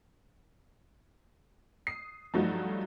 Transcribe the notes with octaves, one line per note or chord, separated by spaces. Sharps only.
D#6 C7
G2 F3 F#3 A3 D#4 F#4